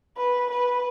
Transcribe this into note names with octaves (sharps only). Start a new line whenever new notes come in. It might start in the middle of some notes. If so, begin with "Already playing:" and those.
B4
B4